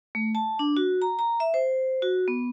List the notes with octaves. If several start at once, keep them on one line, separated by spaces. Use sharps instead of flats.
A3
A5
D4
F#4
A#5
A#5
E5
C5
F#4
B3